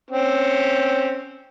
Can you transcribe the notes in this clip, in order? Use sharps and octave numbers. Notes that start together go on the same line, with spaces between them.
C4 C#4